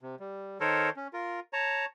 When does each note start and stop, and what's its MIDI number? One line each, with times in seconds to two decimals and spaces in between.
0.01 0.16 48
0.20 0.58 55
0.60 0.90 51
0.60 0.90 69
0.60 0.90 70
0.60 0.90 72
0.60 0.90 73
0.96 1.08 61
1.13 1.40 65
1.13 1.40 70
1.53 1.85 73
1.53 1.85 81
1.53 1.85 82